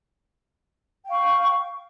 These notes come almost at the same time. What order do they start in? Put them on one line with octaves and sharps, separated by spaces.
G5 F5 C#6